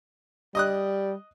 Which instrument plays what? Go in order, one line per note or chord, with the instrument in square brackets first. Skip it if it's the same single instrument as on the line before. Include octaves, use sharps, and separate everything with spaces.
[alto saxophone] G3 [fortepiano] D#5 D#6 F#6